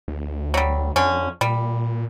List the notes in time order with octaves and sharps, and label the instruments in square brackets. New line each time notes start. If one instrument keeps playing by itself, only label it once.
[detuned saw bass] D2
[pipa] F#3 G3
[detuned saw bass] F2 [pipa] D3 C#4
[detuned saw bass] A#2 [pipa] G3